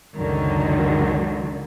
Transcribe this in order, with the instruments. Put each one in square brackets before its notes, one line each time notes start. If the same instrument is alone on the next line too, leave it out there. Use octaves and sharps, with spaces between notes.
[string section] C#2 F#2 D3 D#3 F#3